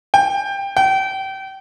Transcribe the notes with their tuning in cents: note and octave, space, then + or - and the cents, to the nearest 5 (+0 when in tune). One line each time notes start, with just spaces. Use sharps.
G5 +15
G5 -30